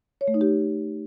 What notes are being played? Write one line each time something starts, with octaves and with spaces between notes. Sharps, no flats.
C#5
A3
D#4
G4